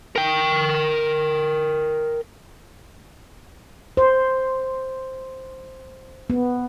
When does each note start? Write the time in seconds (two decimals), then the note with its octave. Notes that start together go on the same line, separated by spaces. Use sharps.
0.16 A#4 G5
3.97 C5
6.30 B3